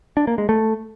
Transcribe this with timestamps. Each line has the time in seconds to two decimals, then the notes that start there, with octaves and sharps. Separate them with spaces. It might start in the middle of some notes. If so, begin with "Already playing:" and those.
0.17 D4
0.27 A#3
0.38 G#3
0.49 A3